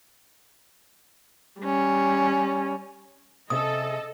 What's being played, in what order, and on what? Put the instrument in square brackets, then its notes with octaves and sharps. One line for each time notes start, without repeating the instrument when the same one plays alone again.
[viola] G3 C#4
[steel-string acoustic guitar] C3 C#4 E5 [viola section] A4 [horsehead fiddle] D#5 [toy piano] D#6